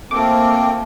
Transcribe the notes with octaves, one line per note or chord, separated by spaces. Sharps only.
A3 A#3 C4 F4 D6